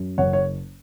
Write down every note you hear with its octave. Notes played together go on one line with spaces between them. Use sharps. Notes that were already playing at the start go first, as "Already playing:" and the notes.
Already playing: F#2
F#1 C#5 F#5
C#5